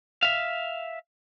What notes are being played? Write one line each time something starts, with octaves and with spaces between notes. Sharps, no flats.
E5 F5